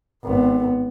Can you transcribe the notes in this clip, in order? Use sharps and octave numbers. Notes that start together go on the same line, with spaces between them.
G#1 B3